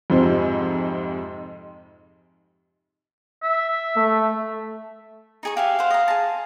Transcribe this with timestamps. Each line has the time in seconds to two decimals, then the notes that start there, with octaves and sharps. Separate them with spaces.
0.10 F2 G#2 C3 F3 C4
3.43 E5
3.96 A3
5.43 D#4 G#4 C#6
5.57 G4 E5 F5 G#5
5.79 C5 F#5
5.90 D#5 A#5
6.08 G#4 A5